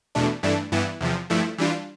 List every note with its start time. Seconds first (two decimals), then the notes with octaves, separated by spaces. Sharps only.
0.15 E2 B2 A3 D4
0.43 G2 E3 A3 D4
0.72 G2 E3 B3 E4
1.00 E2 C3 F3
1.30 G2 F3 A3 E4
1.58 E3 G3 D4 F4